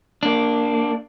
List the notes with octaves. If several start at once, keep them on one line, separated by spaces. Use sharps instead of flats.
A#3 D4